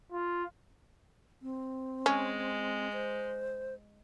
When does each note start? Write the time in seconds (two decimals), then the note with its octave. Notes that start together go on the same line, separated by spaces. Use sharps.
0.12 F4
1.42 C4
2.06 G#3 C#4
2.93 C5